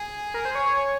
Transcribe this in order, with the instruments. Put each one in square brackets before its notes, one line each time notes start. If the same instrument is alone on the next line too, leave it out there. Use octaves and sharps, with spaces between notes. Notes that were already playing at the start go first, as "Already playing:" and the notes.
Already playing: [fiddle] G#4
[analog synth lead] A#4
C5
C#5
C#5
C#5